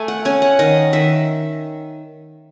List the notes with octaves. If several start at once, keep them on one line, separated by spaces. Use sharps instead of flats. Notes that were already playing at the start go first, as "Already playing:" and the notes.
Already playing: A3 G#5
F#5
C#4 G#5
F#5
D#3 D#5
D#3 E5